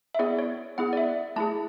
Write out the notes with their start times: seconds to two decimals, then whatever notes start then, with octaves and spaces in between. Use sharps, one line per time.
0.15 E5
0.19 B3 E4 G#4 D5
0.39 C#5
0.78 B3 E4 G#4 F#5
0.93 D5
0.97 E5
1.36 A3 E4 G#4 A5